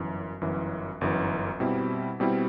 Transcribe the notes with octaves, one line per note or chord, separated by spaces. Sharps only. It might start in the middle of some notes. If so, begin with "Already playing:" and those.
Already playing: G1 F#2 E3
G1 F#2 E3
G1 F#2 E3
B2 G3 C4 E4
B2 G3 C4 E4